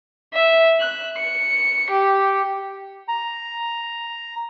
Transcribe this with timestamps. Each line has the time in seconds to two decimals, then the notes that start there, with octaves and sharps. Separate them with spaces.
0.34 E5
0.80 F#6
1.18 C#7
1.90 G4
3.08 A#5